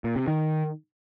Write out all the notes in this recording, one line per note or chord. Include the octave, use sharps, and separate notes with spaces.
A#2
C3
D#3